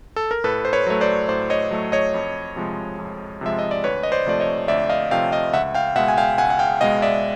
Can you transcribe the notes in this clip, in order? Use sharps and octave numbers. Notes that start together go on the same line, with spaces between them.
A4
A#4
A2 A4 B4
C5
B4 C#5
F#3 A3 C#5
C5 D5
A2 C5 D5
C#5 D#5
F#3 A3
C#5 D#5
F2
C3 F3 G#3
F2
C3 F3 G#3 E5
D#5
D5
D2 B4 C#5
D#5
C5 D5
C3 F3 A3 D5
C#5 D#5
D2 D5 E5
D#5 F5
C3 F3 A3 F5 G5
D#5 F5
C#2 E5 F#5
F5 G5
B2 G#3 E5 F#5
G#5
F5 G5
C#2 F#5 G#5
F#5
F5 G5
B2 G#3 D#5 F5
D5 E5